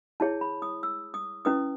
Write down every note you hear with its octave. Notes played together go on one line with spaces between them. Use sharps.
E4 G#4 C#5 A5
B5
D#6
E6
D#6
C#4 E4 B4 D#6